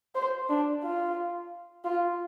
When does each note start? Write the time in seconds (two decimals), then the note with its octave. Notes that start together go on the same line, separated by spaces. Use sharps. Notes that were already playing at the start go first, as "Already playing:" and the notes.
0.15 C5
0.49 D4
0.83 F4
1.84 F4